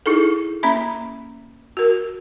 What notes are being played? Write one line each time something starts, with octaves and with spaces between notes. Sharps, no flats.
D#4 E4 G#4 A4
A#3 C#4 E5 A#5 B5
F#4 A#4